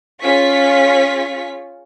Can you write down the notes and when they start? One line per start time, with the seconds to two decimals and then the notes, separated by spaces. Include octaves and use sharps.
0.23 C#4 F4 G#4 C#6 B6